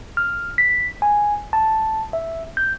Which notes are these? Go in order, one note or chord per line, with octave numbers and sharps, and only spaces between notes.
F6
B6
G#5
A5
E5
G6